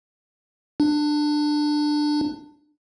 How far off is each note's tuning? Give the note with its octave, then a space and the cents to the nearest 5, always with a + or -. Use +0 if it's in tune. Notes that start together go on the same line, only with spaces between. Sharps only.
D4 +20